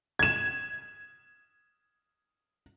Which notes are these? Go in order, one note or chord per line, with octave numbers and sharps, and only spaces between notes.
G#6 E7